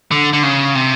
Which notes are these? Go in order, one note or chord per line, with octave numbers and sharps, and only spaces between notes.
D3
D3
C#3
C3